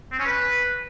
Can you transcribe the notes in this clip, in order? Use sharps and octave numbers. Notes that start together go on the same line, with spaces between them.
C4
C#4
B4